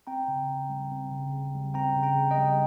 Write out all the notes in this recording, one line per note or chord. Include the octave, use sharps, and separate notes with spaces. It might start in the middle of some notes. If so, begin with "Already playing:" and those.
C4 G5 A#5
C#3
C#3
G3
C4
C#3
C#3
G3
C4 G5 A#5
C#3
G5 A#5
C#3
D#5 G5
G3